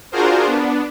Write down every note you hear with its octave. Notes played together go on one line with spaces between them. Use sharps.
D4 F4 F#4 G#4 A#4 C5
B3 D4